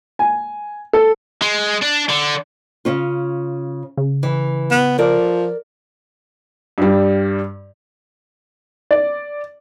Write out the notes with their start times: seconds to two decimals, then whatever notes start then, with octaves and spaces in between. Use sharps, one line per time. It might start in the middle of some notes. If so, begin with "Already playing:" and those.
0.19 G#5
0.93 A4
1.42 G#3
1.82 D4
2.09 D3
2.85 C#3 C#4 F4
3.97 C#3
4.23 E3
4.71 B3
4.98 F3 A#4 D5
6.78 G2 G3
8.91 D5